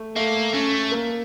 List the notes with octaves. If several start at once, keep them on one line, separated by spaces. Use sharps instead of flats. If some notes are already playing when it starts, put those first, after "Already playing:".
Already playing: A3
A3 A#3
A3 C#4
A#3